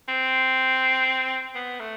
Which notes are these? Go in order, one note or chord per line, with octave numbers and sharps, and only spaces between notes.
C4
B3
A3